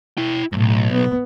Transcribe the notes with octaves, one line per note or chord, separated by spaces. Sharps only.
E4 G5
B1 F#2 A2
B3